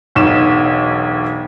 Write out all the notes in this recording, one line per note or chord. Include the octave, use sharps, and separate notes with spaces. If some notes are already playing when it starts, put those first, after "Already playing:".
E1 B1 E7